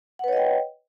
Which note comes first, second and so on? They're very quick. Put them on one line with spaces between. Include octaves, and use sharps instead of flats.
F#5 B4 C#5 D#5 G5